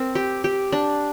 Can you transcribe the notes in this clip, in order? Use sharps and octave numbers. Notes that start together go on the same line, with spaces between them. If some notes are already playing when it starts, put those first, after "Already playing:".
Already playing: C4 A#4
G4
G4
D4